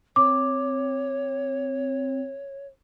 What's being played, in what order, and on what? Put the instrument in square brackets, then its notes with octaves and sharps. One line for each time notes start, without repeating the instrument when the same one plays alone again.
[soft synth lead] C4 [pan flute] C#5 [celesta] D6